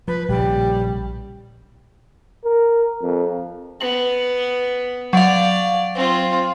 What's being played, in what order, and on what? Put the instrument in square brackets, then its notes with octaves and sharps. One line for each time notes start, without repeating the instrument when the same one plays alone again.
[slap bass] F3 [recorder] B4
[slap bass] A#1 C#3 [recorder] G3
[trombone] A#4
F2
[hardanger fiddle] B3 [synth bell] F#7
[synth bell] F#3 F5 [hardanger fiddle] D5
[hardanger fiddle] C4 F4